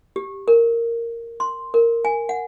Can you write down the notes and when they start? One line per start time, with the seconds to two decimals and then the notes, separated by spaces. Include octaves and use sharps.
0.16 G4
0.48 A#4
1.40 C6
1.74 A#4
2.05 G#5
2.29 F#5